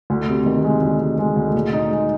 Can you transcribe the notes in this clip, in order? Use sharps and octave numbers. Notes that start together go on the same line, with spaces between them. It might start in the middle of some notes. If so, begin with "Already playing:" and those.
D2
C3
D#3
G#3
D2
G#3
G#3
D2
A#2
D#4
G#3